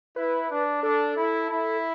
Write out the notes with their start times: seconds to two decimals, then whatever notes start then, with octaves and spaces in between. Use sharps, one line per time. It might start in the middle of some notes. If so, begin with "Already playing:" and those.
0.16 E4 B4
0.49 D4
0.83 D4 A4
1.17 E4
1.50 E4